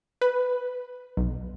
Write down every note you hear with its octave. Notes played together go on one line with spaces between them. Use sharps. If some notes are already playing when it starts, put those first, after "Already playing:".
B4
B1